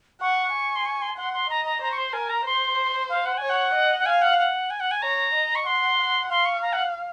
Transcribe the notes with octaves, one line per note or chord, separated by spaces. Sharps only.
F#5 C#6
G#5
C6
C#6
C6
F#5 C6
C6
D#5 A#5
A#5
C5 A#5
C#6
C6
A#4 G#5
A#5
C5 C6
F5
F#5
C#5 G#5
F#5
D#5
F#5
F5 G#5
F#5
F#5
G#5
F#5
G#5
C#5 A#5
D#5
C#6
F#5 C6
F#5
F5 C6
C#6
A#5
F#5